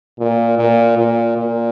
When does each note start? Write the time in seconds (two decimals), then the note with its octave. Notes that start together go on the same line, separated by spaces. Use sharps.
0.20 A#2
0.58 A#2
0.98 A#2
1.38 A#2